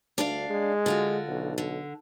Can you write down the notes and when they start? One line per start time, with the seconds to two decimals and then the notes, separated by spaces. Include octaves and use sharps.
0.18 D2 D4 D5 F5
0.49 G#3
0.86 D3 F4 F#4
1.28 B1
1.58 D3